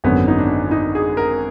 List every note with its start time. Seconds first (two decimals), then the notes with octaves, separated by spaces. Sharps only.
0.04 G#1 F#2 D3 F#3 B3
0.28 D#4
0.38 D4
0.71 D#4
0.95 G#4
1.17 A#4